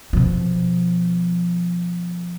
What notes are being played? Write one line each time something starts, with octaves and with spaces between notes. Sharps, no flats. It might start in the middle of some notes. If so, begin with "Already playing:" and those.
B2 F3